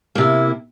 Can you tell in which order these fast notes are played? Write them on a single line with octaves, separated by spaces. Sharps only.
A#3 C3 E4